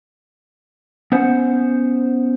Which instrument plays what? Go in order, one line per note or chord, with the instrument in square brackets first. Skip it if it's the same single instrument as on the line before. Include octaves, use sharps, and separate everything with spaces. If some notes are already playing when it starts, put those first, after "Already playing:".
[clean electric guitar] B3 C#4 C5 F#5